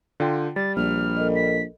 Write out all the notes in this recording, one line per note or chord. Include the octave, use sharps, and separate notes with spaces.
D3 F4 G5
G3 A6
A#1 F6
A4 A#4 D#5
B6